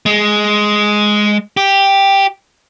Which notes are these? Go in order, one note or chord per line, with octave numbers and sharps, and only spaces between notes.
G#3
G4